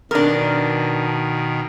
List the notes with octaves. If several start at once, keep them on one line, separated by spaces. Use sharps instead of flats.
B2 D#3 D4 A#4